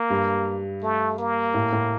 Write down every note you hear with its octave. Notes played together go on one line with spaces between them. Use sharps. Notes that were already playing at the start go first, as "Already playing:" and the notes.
Already playing: A#3
G2
A3
A#3
A2
A2